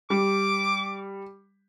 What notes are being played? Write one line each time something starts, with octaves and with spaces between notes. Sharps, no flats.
G3 D6